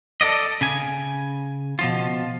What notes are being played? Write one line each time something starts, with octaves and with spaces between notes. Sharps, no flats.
A4 A#4 D5 D#5
C#3 G#5
B2 F3 F4